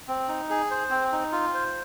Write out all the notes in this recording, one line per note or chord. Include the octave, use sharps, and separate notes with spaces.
C4
D#4
G#4
C5
C4
D#4
F4
C5